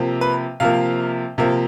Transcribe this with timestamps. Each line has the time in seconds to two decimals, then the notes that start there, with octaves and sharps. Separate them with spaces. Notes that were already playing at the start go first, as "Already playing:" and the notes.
Already playing: C3 F3 A#3
0.21 B4
0.60 C3 F3 A#3 F5
1.38 C3 F3 A#3